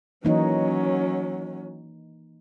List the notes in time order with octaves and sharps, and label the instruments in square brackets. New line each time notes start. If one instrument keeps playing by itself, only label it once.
[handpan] E3 A#3 D#4 [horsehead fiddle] F#3 C#4